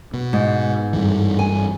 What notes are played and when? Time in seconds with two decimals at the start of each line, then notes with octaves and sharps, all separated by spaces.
0.14 B2
0.33 G#2
0.93 G2 E3
1.39 G#5